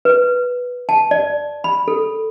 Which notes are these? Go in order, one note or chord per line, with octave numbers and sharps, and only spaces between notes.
B4
A5
D5
B5
A4